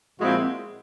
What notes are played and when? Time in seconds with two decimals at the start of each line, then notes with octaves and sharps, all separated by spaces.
0.19 A#2 F3 G#3 C4 E4 F#4